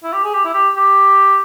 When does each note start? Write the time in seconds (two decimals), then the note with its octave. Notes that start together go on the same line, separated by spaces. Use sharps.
0.04 E4
0.13 G4
0.24 G#4
0.33 G4
0.45 E4
0.54 G4
0.76 G4